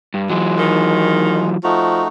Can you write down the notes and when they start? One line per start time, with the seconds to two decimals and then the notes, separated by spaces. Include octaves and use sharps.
0.14 G2
0.30 E3 F#3 G#3
0.59 D#3
1.64 F3 A3 D#4 F#4